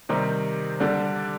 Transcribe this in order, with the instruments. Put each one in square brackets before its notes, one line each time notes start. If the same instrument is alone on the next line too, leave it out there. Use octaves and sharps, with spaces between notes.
[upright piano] C3 D#3 G3 C4 D#4
D3 G3 D4